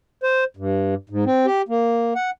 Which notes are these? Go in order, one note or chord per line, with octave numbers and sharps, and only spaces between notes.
C5
G2
G#2
C4
G4
A#3
F#5